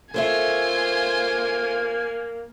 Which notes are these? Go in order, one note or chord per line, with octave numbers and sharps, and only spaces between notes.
A#3 F4 A4 C5 C#5 E5 G#5